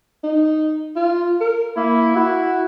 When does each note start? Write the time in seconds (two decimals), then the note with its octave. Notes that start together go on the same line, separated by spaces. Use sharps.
0.24 D#4
0.96 F4
1.41 A#4
1.77 A#3 E4
2.16 E4 F#4